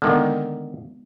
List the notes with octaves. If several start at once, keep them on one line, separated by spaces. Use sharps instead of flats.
D3 D#3 G#3 A#3 B3